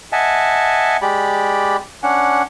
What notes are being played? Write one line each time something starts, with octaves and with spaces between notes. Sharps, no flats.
D#5 E5 F#5 G#5 A5
G#3 G4 D5 B5
C#4 D4 F#5